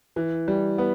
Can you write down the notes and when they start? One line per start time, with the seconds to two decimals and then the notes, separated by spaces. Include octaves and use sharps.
0.16 E3
0.48 G3
0.78 B3